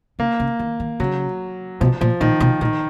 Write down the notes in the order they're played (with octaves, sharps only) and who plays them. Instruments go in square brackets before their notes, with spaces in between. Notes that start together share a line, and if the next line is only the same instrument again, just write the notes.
[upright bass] C#3 [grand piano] A#3
[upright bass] C#3
D#3
D#3
[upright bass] C#3 [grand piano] F#3
[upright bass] B2 [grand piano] F3
[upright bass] A#2 [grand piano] F3
[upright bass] A#2 [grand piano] D#3
[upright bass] B2
[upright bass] A#2 [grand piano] D#3